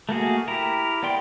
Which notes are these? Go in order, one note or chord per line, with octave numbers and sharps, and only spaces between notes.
A3 A#3 F#4 G#4
E4 G4 A#4
B3 D5 G5 C6